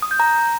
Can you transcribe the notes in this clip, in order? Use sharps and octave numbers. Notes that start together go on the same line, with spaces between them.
D#6
G6
A#5